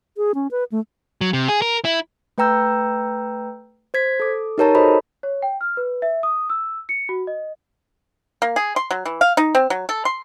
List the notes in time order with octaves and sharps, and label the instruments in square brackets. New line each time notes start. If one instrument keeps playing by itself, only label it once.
[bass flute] G#4
C#4
B4
A3
[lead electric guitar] F#3
C3
G#4
A#4
E4
[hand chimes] A3 B4 G5 A#5 E6 G6
C5 G#6 B6
A4 D6
D#4 G4 A#4 C#5 A5 A#5
F#4 A4 C5 C#5 D#5 B5
[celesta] C#5
G5
F6
B4
E5
D#6
E6
C#7
F#4
D#5
[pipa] A#3
G#4
C6
F#3
E3
F5
D#4
C4
F#3
A4
C6